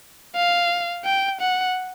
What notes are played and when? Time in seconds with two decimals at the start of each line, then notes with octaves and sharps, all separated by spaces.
0.36 F5
1.05 G5
1.41 F#5